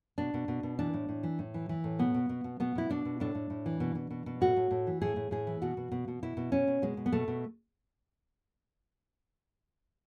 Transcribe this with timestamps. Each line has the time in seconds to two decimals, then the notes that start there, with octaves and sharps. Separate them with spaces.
0.18 B2 D4
0.34 B2
0.48 B2
0.63 B2
0.79 E3 D4
0.94 A2
1.09 A2
1.23 E3
1.39 A2
1.54 E3
1.69 E3
1.84 A2
1.99 B2 B3
2.14 B2
2.29 B2
2.44 B2
2.60 B2 B3
2.75 B2 E4
2.90 B2 D4
3.05 B2
3.20 A2 D4
3.35 A2
3.50 A2
3.66 E3
3.80 B2
3.95 B2
4.10 B2
4.26 B2
4.41 A2 F#4
4.56 A2
4.71 A2
4.87 E3
5.01 A2 G#4
5.16 A2
5.31 A2 G#4
5.47 E3
5.62 B2 F#4
5.77 B2
5.92 B2
6.08 B2
6.23 B2 E4
6.37 B2
6.52 B2 C#4
6.68 B2
6.82 B2 G#3
6.97 B2
7.06 B3
7.12 B2 A3
7.28 B2